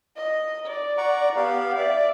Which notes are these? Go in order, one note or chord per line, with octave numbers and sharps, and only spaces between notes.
D#5
D5
F#5 A#5 C#6
B3 G4 F5
D5 E5